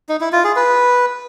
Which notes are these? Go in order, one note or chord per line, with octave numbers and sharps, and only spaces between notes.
D#4
E4
F4
G#4
B4